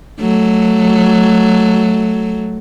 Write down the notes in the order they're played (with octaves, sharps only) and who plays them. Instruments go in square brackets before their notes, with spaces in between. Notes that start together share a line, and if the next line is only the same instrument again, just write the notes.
[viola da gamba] F#3 A3